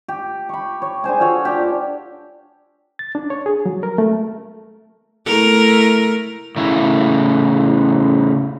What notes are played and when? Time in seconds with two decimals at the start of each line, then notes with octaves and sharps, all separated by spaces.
0.08 G4
0.49 B5 C#6
0.82 C#5
1.04 D4 G#4 C5 G#5
1.20 F4 F#4 A4 C#5
1.45 D4 G4
2.99 A6
3.15 D4
3.30 C#5
3.46 G#4
3.66 F#3
3.83 A#4
3.98 A3
5.26 A3 E4 A#4
6.56 A2 C#3 E4